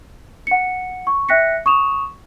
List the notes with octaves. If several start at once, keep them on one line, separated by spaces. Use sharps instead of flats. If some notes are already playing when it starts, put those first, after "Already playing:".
F#5 C#7
C#6
E5 G5 F#6 A#6 B6 C#7
C#6 D#6 E7 F7